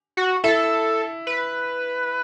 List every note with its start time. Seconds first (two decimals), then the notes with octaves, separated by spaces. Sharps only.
0.17 F#4
0.44 E4 A4
1.27 B4